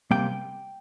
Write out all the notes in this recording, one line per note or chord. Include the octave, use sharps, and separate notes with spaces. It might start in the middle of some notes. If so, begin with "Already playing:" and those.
C3 G3 A#3 G5